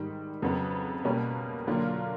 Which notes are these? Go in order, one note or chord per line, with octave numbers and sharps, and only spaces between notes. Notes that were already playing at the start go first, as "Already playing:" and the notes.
Already playing: G#2 D#3 G3
F2 C#3 F#3 B3
B2 G3 A#3 C#4
D3 F#3 A#3 D4 F4